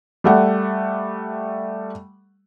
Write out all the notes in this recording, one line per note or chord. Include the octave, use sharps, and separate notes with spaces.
G3 A3 F#5